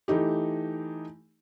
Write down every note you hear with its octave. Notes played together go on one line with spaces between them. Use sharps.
E3 A3 D#4 G4